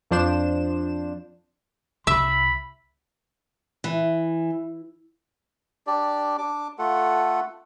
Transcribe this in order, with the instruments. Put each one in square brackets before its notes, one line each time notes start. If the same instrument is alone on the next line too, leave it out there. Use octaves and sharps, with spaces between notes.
[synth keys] F2 F3 D4 C5 E7
[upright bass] C2 [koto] E5 [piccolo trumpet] B5
[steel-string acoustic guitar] E3
[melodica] D4 G4 D5
D4 D6
A3 F4 A4 F#5